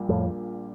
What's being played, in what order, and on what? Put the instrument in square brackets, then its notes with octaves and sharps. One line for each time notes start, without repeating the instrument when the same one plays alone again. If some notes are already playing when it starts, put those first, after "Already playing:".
Already playing: [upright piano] A#1 A#2 G3 A#3
[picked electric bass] F2 A2